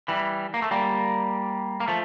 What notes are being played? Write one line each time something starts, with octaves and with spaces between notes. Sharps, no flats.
E3 G3
A#3
A3
G3 A#3
A#3
F3 A3